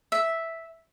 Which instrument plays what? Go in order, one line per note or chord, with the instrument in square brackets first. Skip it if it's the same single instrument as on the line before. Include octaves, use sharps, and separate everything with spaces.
[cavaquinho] E5